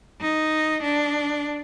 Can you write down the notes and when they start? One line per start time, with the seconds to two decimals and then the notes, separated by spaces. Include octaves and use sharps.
0.21 D#4
0.83 D4